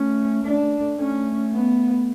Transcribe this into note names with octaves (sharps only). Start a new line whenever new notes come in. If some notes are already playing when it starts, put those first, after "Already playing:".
Already playing: A3 C#4
A3 D4
A3
A3
A3 C#4
B3